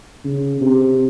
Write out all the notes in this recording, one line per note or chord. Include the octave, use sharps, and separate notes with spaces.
C#3
C3